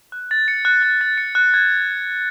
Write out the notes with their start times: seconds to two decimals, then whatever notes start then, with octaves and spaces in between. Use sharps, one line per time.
0.12 F#6
0.31 A6
0.48 C#7
0.65 F#6
0.82 F#6
1.01 A6
1.18 C#7
1.35 F#6
1.54 G#6